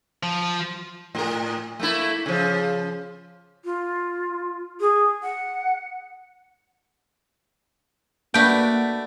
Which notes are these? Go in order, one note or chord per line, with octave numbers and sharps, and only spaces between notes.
F3
A2 A#4
A3 A#3 E4
C#3 F3
F4
G#4
F#5
A3 A#3 D4 F#4 B4 G5